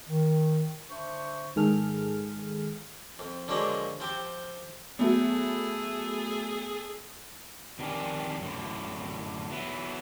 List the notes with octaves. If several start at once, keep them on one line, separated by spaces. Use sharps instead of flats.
D#3
D3 D4 C5 E5 C#6
G#2 D#3 G#4 A4 F6
F2
D3 F3 F#3 G#3 A#3 D4
F3 C4 G4
F#3 A3 B3 G#4 A4
F2 D#3 D4 G4 A#4 G#5
F#2 A2 D3
F#3 B3 E4